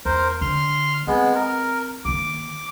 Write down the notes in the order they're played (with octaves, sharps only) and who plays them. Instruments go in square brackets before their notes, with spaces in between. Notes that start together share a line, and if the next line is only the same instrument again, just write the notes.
[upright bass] E2 [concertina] A#4 C5
[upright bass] D3 [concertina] C6 F6
[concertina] G#3 B3 [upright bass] C4
[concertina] A#4
[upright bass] D#3 A#3 [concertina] D6